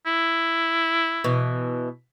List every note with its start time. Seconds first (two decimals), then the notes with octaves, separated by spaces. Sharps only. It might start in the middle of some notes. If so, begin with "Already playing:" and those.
0.06 E4
1.24 B2 E3